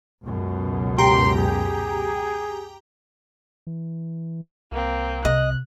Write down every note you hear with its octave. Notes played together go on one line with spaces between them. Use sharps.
C#2 F#2 B2
G4 G5 A#5 C6
G#4
E3
C2 A#3 C4
C3 D#5 F#6